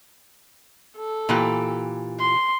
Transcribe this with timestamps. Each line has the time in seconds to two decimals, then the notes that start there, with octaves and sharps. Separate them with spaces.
0.97 A4
1.29 A#2 E3 G4
2.20 C6